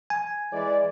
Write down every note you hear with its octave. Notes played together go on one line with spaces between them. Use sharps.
G#5
E3 G#3 D5